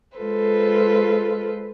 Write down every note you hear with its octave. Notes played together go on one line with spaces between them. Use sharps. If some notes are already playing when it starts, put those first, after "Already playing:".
G#3 F4 A4 B4 C5